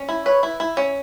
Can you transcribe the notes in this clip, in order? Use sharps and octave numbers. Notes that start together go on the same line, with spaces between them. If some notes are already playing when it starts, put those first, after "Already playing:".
Already playing: C#4
E4
B4 C#5
E4
E4
C#4